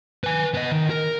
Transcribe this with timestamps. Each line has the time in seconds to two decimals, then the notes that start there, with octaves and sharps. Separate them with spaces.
0.24 B4 G#5
0.54 B3 D#5
0.72 D#3
0.90 A#4